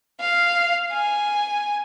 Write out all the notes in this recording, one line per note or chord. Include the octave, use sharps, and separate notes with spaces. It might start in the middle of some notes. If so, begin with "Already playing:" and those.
F5
G#5